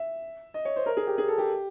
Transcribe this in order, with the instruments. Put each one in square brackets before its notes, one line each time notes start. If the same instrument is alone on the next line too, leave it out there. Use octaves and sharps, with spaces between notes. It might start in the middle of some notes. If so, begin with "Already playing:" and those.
Already playing: [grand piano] E5
D#5
C#5
C5
A#4
G#4
G4
G#4
A4
G4